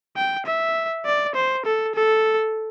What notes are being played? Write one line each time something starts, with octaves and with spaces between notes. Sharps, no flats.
G5
E5
D5
C5
A4
A4